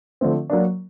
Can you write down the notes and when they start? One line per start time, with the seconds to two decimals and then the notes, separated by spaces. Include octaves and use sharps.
0.21 D3 F3 A3 C4
0.50 F#3 A#3 D4